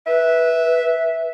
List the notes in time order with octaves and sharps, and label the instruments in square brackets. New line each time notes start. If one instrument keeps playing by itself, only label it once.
[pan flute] B4 [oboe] E5